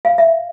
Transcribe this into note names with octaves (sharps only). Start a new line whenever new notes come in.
F5
E5